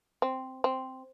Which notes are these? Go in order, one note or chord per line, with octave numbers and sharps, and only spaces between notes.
C4
C4